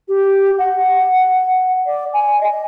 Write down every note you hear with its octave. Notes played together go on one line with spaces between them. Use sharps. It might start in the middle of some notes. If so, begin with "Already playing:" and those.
G4
F#5
D5
G#5
D#5